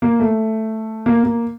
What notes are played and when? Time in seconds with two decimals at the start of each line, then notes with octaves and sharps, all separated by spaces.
0.02 A#3
0.20 A3
1.06 A#3
1.23 A#3